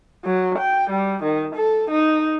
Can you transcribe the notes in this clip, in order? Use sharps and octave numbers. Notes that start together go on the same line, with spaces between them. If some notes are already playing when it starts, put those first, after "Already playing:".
F#3
G5
G3
D#3
A4
D#4